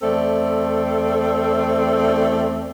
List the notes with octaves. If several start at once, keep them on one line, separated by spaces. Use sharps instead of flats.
E2 A3 C4 A4 D5